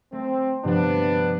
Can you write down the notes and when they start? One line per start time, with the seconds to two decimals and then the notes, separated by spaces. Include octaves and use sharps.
0.12 A3 C4
0.64 G2 C3 F3 B3 D4